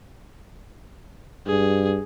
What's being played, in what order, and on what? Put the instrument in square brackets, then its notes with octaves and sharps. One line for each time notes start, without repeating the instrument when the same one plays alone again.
[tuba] G2 [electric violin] G#4